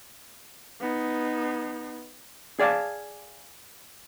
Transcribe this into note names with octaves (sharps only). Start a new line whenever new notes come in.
B3 D#4
G#4 D5 F5 F#5 A5